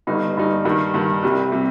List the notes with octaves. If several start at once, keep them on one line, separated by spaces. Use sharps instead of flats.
G1 G2 G3 D#4
G1 G2 G3 D#4
G2 D#3 G3
G2 D#3 G3
C2 C3 G3
C3 G3